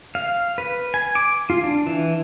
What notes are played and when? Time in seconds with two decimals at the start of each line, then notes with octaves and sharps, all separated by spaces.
0.15 F5
0.58 B4
0.94 G#5
1.15 D6
1.50 F4
1.64 D4
1.86 E3